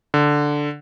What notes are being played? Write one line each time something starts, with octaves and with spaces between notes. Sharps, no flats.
D3